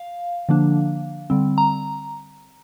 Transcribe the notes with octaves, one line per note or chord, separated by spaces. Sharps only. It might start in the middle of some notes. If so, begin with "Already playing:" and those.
Already playing: F5
D3 F3 A#3 D4
D3 G3 C4
A#5